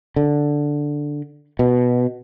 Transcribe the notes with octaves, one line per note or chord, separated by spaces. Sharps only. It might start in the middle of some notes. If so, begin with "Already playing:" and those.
D3
B2